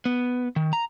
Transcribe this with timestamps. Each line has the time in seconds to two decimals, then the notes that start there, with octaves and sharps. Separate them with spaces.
0.06 B3
0.56 D#3
0.73 A#5